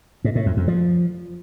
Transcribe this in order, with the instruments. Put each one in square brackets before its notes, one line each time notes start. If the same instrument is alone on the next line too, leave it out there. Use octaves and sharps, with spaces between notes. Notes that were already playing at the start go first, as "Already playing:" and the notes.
[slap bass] G#2
A2
F2
F2
F3